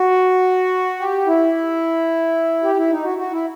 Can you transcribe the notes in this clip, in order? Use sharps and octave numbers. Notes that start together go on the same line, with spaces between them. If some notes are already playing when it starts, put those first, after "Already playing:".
Already playing: F#4
G4
E4
G4
E4
D#4
F#4
F#4
E4